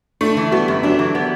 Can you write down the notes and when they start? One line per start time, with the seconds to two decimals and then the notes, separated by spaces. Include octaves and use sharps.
0.21 A3 D4
0.37 E3
0.52 G3 B3
0.68 F#2
0.83 F#3 D4
0.99 E3
1.15 B3